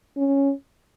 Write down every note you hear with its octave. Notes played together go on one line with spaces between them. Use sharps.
C#4